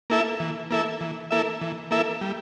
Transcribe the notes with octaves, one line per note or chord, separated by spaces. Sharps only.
A#3 E4 A4 E5
E3
A#3 E4 A4 E5
E3
A#3 E4 A4 E5
E3
A#3 E4 A4 E5
G3